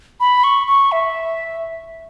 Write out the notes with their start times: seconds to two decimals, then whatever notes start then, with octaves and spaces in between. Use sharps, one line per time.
0.20 B5
0.44 C#6
0.67 C#6
0.92 E5